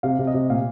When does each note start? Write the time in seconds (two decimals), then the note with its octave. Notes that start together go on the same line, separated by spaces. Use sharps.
0.03 C3 F5
0.19 C3
0.27 D#5
0.34 C3
0.50 A#2 F5